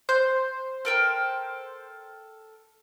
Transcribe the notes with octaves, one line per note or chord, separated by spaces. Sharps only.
C5 G6
A4 A#4 G5